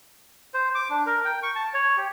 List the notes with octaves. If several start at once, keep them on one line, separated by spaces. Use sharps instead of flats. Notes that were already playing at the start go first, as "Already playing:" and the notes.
C5
D6
D4
A#4
G5
C#6
A5
C#5
G4